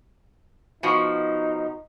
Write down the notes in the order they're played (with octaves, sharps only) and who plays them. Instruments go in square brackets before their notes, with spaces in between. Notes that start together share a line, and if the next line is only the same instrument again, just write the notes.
[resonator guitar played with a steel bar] B2 F3 [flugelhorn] D#4